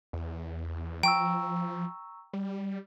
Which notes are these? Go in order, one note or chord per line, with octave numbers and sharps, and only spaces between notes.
E2
F3 G5 A#5 C#6 E6
G3